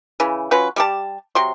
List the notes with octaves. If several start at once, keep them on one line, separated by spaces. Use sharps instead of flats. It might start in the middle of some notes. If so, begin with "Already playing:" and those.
C#3 E3
F#3 C#4 F4 B4
G3 G4 A5
C3 F#3 C6